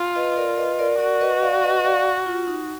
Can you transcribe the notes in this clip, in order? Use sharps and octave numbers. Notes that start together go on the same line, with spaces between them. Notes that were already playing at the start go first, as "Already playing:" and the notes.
Already playing: F4
B4 D#5
A#4 D5
B4 D#5
A#4 D5
F#4 A#4 D5
B4 D#5
D5 F5
B4 D#5
D5 F5
F4
D#4